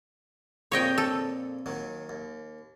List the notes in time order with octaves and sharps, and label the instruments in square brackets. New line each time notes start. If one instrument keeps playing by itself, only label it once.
[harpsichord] F2 A#2 C#3 [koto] C#5 D#5 G5
[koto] A4
[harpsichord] D#2 D#3 F#3
D#2